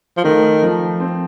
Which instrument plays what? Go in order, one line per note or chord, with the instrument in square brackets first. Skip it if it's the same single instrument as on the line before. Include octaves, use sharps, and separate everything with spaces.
[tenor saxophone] F3
[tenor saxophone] D#3 [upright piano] A3
[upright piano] F3
C4